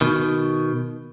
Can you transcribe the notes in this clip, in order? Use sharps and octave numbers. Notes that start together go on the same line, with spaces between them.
B2 D#3